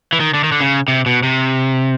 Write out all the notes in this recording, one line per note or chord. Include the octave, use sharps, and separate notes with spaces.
E3
D#3
D3
D#3
D3
C#3
C3
B2
C3